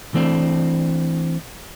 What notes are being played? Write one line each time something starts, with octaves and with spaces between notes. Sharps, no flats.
E3 A3 C4 D4